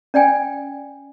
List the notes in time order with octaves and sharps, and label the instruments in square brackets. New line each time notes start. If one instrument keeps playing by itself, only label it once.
[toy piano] C#4 D5 G5 G#5